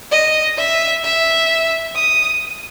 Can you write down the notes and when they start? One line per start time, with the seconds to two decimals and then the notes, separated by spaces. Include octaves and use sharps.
0.12 D#5
0.58 E5
1.04 E5
1.95 D#6